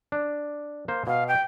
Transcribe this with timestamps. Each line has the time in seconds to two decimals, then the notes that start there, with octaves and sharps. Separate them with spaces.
0.12 D4
0.88 A#3 C5
1.07 B2 F5
1.28 G5